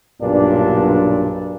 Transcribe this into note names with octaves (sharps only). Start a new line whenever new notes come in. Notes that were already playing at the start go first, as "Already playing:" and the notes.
B1 G2 A#2 D4